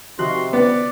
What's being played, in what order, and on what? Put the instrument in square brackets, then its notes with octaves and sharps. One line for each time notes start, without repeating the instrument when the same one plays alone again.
[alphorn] C3 [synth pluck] D#3 F3 F#4 [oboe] C6
[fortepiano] B3 [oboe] D5